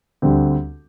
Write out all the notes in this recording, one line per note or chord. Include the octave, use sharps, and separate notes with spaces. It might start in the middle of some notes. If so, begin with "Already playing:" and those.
D2 D3 G3 C4 G4